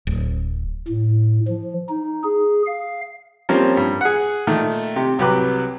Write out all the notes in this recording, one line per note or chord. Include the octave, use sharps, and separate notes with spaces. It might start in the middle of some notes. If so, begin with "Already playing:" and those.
D1
A2
F3
D#4
G#4
F5
F3 G3 A#3 C4 C#4
G2
G#4 F#5
A#2 D#3 A3
C3 G4
C2 F#3 G4 B4 D6